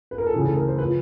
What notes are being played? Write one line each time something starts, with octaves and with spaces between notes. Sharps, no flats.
B4
A#4
A4
D2 C#3 E3 G#4
A4
A#4
C5
C#3 F3 B4